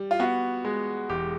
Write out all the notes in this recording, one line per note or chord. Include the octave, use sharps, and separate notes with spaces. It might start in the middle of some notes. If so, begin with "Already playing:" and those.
Already playing: G3
F4
B3 F#4
G#3
E1 G4